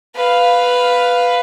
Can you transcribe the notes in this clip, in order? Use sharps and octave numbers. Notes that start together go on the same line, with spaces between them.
B4 F5